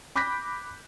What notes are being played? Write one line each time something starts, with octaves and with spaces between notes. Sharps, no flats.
B5 D6 F#6 G6 A#6 B6